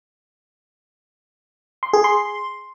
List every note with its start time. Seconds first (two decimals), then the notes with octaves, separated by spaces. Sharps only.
1.83 C6
1.93 G#4
2.04 C6